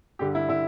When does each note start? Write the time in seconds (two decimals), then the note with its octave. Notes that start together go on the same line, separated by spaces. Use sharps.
0.19 G2 D3 G4
0.35 E4
0.48 D3 E4